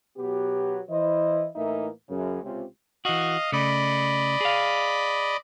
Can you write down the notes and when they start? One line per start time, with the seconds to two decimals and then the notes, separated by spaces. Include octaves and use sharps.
0.17 B2 F#3 B3 G4
0.89 E3 E4 B4 C5 D#5
1.56 A2 E3 A#3 D#4 A#4 E5
2.09 F#2 C#3
2.43 C#2 C3 C4 C#4 F4 G4
3.05 E3 F#4 D#5 F5
3.52 C#3 A3 D5 D#5 B5
4.41 G#4 F5